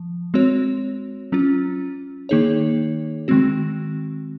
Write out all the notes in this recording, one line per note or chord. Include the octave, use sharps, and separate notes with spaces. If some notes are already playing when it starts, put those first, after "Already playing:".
Already playing: F3
G#3 C4 F#4 C#5
F#3 C#4 F4
D#3 A#3 D#4 G#4 C#5
D#3 G#3 C4 F#4